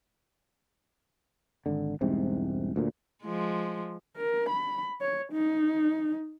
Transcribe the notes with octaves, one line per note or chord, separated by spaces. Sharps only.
G#1 D3
E1 C2 G#2 C3
D2 A#2
F3 G#3
A#4
B5
C#5
D#4